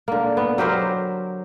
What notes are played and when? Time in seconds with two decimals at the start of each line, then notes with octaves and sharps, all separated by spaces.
0.08 D3 A#3
0.37 B3
0.58 F#3 G4 A#4 C5